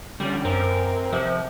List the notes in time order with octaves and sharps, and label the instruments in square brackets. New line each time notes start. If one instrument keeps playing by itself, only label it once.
[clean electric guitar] D3 F3 C#4 [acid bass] G3 [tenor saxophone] G4
[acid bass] F#2 [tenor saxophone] C4 [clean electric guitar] A#4
[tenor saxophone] C3 [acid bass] F3